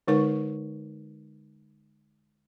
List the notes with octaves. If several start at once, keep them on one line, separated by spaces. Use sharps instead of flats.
D3 G#3 D#4 A#4 B4 C#6